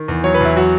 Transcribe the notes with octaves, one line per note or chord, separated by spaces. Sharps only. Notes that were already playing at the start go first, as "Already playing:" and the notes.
Already playing: D#3
E2
F#3 C#5
B4
E2 E4
F#3 F#4